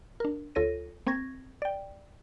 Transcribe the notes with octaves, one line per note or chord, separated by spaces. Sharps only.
D4 A#4
D2 F4 A4 C#5 A#6 D#7
A#3 C4 C#6 G#6 A#6
D5 G5